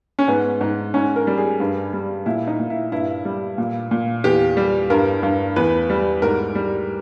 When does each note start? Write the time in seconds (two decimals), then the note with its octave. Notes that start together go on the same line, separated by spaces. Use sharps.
0.19 C#4
0.28 G#2 B3
0.61 G#2
0.94 G#2 C#4
1.16 A#4
1.27 G3
1.38 G#4
1.60 G2
1.93 G3
2.26 A#2 E4
2.48 D#4
2.59 A#2
2.70 E4
2.92 G2 E4
3.25 G3
3.58 A#2
3.91 A#2
4.24 E2 G4
4.57 G3
4.90 G2 A#4
5.23 G2
5.56 E2 B4
5.90 G3
6.22 G#2 A#4
6.55 G3